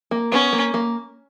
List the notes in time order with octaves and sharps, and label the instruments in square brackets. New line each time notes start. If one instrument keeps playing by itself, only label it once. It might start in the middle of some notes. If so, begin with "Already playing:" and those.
[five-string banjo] A#3
[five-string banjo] B3 [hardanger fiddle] C#4
[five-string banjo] A#3
A#3